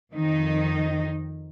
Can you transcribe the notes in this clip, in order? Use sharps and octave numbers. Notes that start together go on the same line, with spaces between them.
F2 D#3 D#4